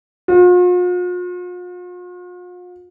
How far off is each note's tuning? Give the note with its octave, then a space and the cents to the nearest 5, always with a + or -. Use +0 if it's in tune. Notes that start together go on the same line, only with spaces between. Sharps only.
F4 +45